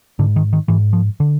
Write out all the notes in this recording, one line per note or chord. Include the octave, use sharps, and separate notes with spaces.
G#2 D3
D#3
D#3
G#2 E3
F3
D3